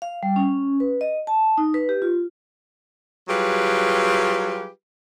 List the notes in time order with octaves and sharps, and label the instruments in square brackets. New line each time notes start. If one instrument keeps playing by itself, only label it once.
[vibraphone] F5
G3
C#4
B4
D#5
A5
D#4
B4
G4
F4
[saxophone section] F#3 G3 F4 G4 G#4 B4